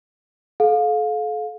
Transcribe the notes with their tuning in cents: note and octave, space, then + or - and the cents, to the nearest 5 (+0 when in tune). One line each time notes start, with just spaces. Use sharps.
A4 -40 F5 +20